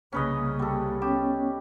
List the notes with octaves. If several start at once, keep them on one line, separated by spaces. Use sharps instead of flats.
C2 C#3 A#3 C#4 B4 D#5
G3 A4
B3 C#4 G4 C#5